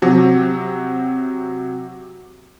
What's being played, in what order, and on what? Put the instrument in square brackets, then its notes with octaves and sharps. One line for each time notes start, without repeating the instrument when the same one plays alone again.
[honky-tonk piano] C3 F#3